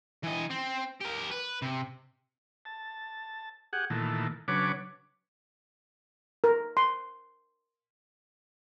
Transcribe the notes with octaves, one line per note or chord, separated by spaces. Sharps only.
E3 D#5
C4
G4 A#4
B4
C3
A5
G4 G#4 F#5
A#2 D#3 E3 A3
C#3 F#3 D4 B4 C#5 D6
A#4
C6